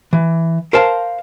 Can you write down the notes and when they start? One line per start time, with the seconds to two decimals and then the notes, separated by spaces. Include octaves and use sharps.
0.13 E3
0.73 A#4 C5 F5 A5